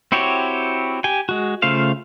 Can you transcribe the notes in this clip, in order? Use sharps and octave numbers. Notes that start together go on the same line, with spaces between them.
C4 E4 F#4 G4 C#5
G4 G5 G#5
G#3 F#4
C#3 A3 F4 C5 F5